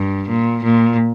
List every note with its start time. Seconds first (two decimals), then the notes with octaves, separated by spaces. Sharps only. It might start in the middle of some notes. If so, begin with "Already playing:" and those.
Already playing: G2
0.29 A#2
0.64 A#2